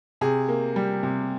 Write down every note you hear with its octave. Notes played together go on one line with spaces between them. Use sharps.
C3 G#4
A#3
G3
C3